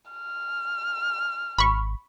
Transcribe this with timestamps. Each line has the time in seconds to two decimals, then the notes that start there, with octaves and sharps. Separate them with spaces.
0.11 F6
1.58 G#1 B5 C#6